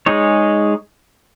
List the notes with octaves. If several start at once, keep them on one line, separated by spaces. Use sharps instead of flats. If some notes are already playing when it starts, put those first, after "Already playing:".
G#3 D#4 G#4 C#5